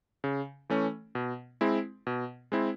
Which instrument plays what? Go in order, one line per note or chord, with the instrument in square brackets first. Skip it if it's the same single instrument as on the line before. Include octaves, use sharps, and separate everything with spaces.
[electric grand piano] C#3
E3 A3 C#4
B2
G#3 C4 E4
B2
G#3 C4 E4